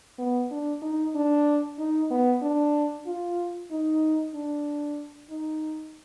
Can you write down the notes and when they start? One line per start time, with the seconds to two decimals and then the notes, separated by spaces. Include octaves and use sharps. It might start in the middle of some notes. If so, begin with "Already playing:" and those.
0.18 B3
0.51 D4
0.82 D#4
1.15 D4
1.79 D#4
2.10 B3
2.42 D4
3.07 F4
3.71 D#4
4.34 D4
5.30 D#4